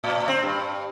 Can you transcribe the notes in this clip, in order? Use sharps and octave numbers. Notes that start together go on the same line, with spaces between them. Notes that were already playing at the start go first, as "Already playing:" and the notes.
A2
C4
G2